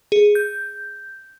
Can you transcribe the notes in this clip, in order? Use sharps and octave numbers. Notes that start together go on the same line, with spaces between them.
G#4
G6